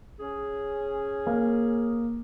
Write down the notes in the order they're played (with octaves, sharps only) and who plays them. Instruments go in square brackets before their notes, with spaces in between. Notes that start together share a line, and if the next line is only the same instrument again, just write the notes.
[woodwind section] C#4 G#4
[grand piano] A#3